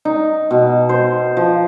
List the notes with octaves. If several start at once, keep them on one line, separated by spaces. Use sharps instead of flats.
D#4
B2
C5
F3